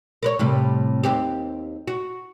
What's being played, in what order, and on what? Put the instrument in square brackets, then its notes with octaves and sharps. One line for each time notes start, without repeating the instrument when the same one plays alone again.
[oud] A#4 B4 C#5
A2 C3 G3
D#2 C4 G4
F#4